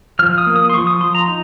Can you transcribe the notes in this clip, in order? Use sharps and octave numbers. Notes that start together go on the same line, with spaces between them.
F3 F6
D#6
A#3
D#6
C6
F3 C#6
D#6
F3 C6
A#5
D#4